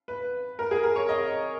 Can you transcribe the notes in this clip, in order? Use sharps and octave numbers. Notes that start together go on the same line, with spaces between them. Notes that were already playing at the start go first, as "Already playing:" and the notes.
B4
A#4
G#4
A#4
C#5
D#5